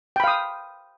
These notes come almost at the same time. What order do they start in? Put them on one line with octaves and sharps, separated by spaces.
G5 B5 F5 D#6